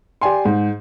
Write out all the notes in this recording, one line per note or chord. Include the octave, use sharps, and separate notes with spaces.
G4 D5 G#5 C6
G#2